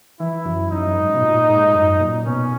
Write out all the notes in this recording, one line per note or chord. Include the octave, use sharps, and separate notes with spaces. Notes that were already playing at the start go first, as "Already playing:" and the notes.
E3 E4
F#2
F#2 D#4
F#2
G#2
B2
A#2
G#2
F#2
A#2
B2 C#4